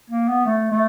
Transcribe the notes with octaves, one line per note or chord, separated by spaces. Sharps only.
A#3
B3
A3
A3